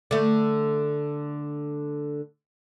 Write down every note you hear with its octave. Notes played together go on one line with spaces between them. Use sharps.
D3 A3